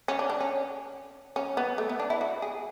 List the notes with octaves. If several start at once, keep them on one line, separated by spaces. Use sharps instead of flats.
C#4
D4
D4
C#4
C#4
B3
A3
B3
D4
E4
F#4
G#4